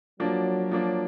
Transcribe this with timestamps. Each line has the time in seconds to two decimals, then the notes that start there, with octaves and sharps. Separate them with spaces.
0.20 F3 F#3 A#3 D4
0.71 F3 A#3 D4